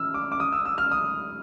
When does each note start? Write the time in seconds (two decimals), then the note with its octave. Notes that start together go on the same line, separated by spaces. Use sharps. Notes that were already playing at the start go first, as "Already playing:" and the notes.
Already playing: E6 F6
0.14 D6
0.32 D6
0.40 D#6
0.52 E6
0.65 E6
0.78 F6
0.91 D#6